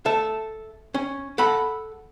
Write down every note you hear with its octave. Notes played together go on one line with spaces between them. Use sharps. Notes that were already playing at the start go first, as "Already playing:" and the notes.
A4 E5
C#4
A4 F#5 B5